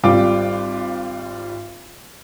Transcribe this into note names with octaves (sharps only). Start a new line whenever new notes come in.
G#1 G3 F4 D6